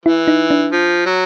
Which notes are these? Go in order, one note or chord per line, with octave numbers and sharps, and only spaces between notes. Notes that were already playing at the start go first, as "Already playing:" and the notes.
E3 E4
D#4
D4
F3
F#3